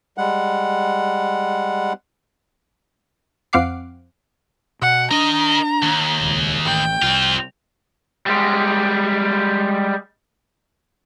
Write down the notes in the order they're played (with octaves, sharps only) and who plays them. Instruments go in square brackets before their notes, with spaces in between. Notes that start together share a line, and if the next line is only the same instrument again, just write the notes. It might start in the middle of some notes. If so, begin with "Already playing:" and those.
[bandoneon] G3 G#3 F#5
[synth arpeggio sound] F2 C4 F5 F#5 D6 C7
[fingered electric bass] B2 [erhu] F#5
[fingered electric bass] D4 [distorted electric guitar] A#4 D#5 [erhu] A#5
[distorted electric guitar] D#2
[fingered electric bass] D#1 C#2
[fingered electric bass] A1 [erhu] G5
[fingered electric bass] C2 [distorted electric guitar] C4 F4
[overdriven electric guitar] G3 G#3